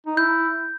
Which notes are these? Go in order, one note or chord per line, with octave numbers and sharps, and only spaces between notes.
D#4
E4 G6